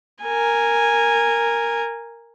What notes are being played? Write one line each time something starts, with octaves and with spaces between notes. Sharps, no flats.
A#4 G#5